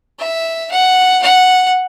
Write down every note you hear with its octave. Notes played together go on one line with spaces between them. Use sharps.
E5
F#5
F#5